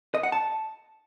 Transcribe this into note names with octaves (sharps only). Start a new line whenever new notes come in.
D#5
F#5
A5